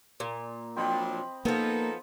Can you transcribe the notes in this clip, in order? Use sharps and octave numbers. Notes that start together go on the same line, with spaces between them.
A#2
F3 F#3 C4 D4 D#5 B5
F3 A#3 B3 D#4 A4 A#4